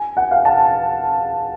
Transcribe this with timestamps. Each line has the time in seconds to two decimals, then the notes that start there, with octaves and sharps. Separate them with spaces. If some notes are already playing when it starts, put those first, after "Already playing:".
Already playing: G#5
0.17 F#5
0.31 F5
0.45 A5